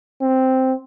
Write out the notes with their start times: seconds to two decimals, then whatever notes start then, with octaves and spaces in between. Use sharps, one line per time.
0.22 C4